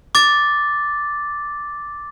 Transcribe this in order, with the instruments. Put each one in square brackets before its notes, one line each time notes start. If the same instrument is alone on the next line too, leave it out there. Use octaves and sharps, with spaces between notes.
[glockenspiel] D6 A6